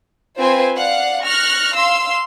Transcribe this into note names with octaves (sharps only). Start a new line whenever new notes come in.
C4 F4 B4 C5 G#5
D5 F5 F#5
C#6 F6 F#6 A#6
F5 C6 E6